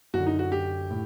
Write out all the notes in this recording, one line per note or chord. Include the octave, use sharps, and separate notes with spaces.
F#2 D3 F#4
D#4
F#4
G4
A2